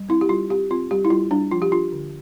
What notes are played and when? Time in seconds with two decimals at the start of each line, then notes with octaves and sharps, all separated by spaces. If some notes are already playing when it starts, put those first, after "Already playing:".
Already playing: G3
0.09 C4 E4
0.21 G4
0.29 G3 F4
0.50 C4 G4
0.71 C4 F4
0.91 G3 G4
1.05 E4
1.10 G3 F4
1.31 G3 D4
1.51 F3 F4
1.62 G4
1.71 D4 F4
1.92 D3